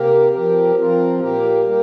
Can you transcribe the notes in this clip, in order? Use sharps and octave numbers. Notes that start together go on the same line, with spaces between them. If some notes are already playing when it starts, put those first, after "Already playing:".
Already playing: C3 A#3 G4 A#4
F3 C4 G4 A#4
F3 C4 F4 A#4
A#2 A#3 G4 A#4
G3 A#3 G4 A#4